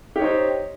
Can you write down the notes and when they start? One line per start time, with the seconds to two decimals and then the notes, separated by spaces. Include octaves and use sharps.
0.16 G4
0.18 C#5
0.21 D#4
0.24 C5